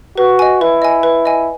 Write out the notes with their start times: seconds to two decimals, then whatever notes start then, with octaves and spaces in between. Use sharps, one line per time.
0.18 F#4 B4
0.39 D#5 G#5
0.61 E4 B4
0.82 D#5 G#5
1.03 B4
1.25 D#5 G#5